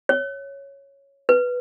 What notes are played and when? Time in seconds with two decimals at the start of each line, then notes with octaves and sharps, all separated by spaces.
0.09 C#5
1.29 B4